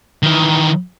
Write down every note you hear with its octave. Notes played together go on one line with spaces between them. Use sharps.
D#3 E3